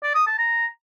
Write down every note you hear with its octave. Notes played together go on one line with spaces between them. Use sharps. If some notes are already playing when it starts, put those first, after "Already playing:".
D5
D#6
A5
A#5